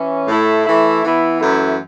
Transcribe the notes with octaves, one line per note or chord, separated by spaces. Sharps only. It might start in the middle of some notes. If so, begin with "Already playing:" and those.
Already playing: E3 C#4
A2 A3 E4
E3 A3 E4
E3 B3 E4
F#2 E3 A3 E4